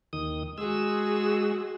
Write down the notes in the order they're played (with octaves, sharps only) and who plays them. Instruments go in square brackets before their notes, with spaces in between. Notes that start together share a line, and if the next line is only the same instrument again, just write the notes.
[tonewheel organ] D#2 D#3 D#6
[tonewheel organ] G#3 E6 [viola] F#4 G#4